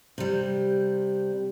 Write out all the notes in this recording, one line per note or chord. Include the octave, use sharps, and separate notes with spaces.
C3 G3